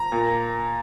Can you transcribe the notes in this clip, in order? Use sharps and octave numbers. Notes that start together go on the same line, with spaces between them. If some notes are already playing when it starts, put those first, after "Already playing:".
Already playing: A#5
A#2